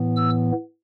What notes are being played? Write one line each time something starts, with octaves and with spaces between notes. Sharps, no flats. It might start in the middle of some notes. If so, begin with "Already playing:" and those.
Already playing: A2 E3 B3
E6